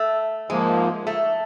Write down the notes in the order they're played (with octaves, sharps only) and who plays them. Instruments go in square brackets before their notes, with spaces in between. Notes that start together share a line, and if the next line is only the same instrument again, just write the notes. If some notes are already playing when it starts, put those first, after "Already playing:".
Already playing: [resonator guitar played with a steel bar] A3
[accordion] G#2 F3 A#3 [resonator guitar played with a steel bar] G#3
[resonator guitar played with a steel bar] A3